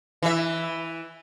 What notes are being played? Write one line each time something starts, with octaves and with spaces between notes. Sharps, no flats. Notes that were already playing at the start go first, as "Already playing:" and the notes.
E3 E5